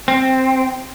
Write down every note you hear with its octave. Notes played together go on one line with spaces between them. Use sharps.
C4